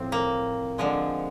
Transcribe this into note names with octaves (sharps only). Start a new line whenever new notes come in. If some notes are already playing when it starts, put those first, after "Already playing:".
Already playing: A2 F3 C4
A#3
D3 F3 G#3